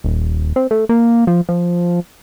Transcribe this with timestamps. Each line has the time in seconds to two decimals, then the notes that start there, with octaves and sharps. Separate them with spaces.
0.04 D#1
0.56 C4
0.71 A3
0.89 A#3
1.27 F3
1.49 F3